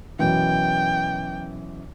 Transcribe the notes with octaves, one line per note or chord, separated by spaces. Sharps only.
F#2 B2 E3 G5